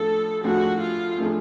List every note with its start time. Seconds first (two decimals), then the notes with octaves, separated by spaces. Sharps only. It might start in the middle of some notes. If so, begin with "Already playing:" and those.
Already playing: A2 F3 A3 D4 A4
0.44 A2 F3 A3 D4 F#4 G#4
0.80 F4
1.18 A2 F3 A3 D4 G#4